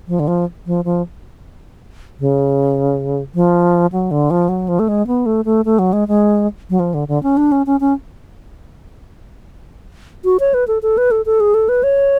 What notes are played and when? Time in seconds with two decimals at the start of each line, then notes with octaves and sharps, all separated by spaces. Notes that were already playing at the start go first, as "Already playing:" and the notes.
0.08 F3
0.20 D3
0.28 F3
0.66 F3
0.85 F3
2.20 C#3
3.35 F3
3.92 F#3
4.11 D3
4.31 F3
4.49 F#3
4.68 F3
4.79 A3
4.88 G#3
5.07 B3
5.26 A3
5.45 A3
5.65 A3
5.79 F#3
5.93 G#3
6.08 G#3
6.70 F#3
6.80 F3
6.94 D3
7.08 D3
7.23 C#4
7.37 D4
7.52 C#4
7.66 C#4
7.80 C#4
10.24 F#4
10.40 C#5
10.54 B4
10.68 A4
10.83 A4
10.98 B4
11.11 A4
11.26 A4
11.40 G#4
11.54 A4
11.69 B4
11.83 C#5